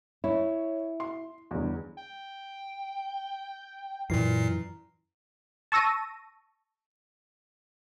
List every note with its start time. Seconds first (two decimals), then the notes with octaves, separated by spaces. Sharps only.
0.24 E4 C#5
1.00 C6
1.51 G1 E2
1.97 G5
4.10 F#2 A#2 E3 A#4 C7
5.72 A5 C#6 E6 A#6 D#7